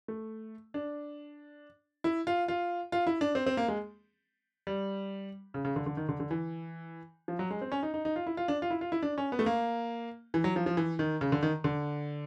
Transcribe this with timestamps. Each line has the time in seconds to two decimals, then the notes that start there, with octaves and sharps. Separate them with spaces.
0.08 A3
0.74 D4
2.04 E4
2.27 F4
2.48 F4
2.92 F4
3.07 E4
3.21 D4
3.35 C4
3.46 C4
3.57 A#3
3.68 G#3
4.67 G3
5.54 C#3
5.65 C#3
5.76 D3
5.86 D3
5.97 D#3
6.09 D3
6.20 D3
6.31 E3
7.28 F3
7.39 F#3
7.51 G#3
7.61 C4
7.72 C#4
7.83 D#4
7.94 D#4
8.05 D#4
8.16 F4
8.27 E4
8.37 F4
8.48 D4
8.62 F4
8.70 E4
8.81 F4
8.92 E4
9.03 D4
9.18 C#4
9.32 B3
9.39 A3
9.46 A#3
10.34 E3
10.44 F#3
10.56 F3
10.66 F3
10.77 E3
10.99 D#3
11.21 C#3
11.32 D3
11.43 D#3
11.64 D3